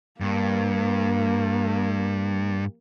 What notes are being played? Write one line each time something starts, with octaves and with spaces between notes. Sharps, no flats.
G2 A#3